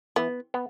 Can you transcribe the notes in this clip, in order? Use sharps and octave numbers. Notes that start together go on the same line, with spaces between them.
E3 B3
B3